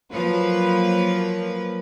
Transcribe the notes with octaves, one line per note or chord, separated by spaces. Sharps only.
F3 F#3 A#3 B4